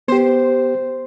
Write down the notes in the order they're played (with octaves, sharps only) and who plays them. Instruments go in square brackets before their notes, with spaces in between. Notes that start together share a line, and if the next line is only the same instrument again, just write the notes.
[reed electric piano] B3 G4 [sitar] C5